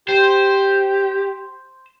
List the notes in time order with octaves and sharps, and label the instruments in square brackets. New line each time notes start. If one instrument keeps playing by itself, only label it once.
[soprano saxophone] G4 [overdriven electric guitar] C5